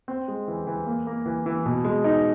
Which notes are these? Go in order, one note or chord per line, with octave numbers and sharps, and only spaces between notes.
C4
G#3
E3
E3
A#3
A#3
E3
E3
B2
G#3
D#4